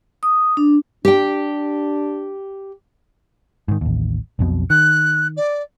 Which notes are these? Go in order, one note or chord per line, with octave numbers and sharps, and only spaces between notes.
D#6
D4
D4 G4 G5
G#2 D#3
A1 D#2
B1 F2 B2
D#3 F#6
D5